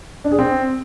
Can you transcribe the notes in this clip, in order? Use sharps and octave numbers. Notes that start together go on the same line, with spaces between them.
D4
G#4
C4